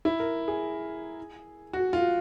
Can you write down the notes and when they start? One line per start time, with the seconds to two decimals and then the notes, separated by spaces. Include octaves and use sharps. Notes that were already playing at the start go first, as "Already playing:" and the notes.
0.05 E4
0.20 A#4
0.48 G#4
1.73 F#4
1.93 F4